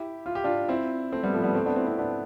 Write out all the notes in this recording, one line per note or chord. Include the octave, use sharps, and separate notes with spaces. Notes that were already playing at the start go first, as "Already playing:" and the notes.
Already playing: E4 G4
F4
G4
D4 F4
C4 E4
A3 C4
G3 B3
F3 A3
G3 B3
A3 C4
B3 D4
C4 E4
C4 E4
B3 D4